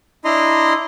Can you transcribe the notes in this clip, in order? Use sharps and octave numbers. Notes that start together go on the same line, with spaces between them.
D4 E4 D#5 A#5 C6